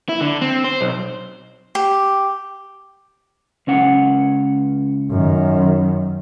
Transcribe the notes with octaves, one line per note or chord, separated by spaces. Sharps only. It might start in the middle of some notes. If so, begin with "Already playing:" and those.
E4
D3
C4
C5
B1
G4
C#2 C#4 F#5
F#2 D#3